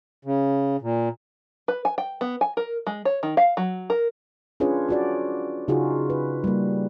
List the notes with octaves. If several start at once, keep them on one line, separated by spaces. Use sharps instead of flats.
C#3
A#2
B4
G#5
G5
B3
G#5
A#4
G#3
C#5
D#3
F5
F#3
A#4
C#4 D4 F4 G#4 B4 C#5
F4 F#4 D5
C#3 D#4 F4 F#4 G#4
B4
G3 A#3